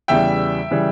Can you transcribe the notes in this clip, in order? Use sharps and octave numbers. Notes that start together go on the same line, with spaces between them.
E2 C#3 E3 G3 E5 G5
C#3 E3 G3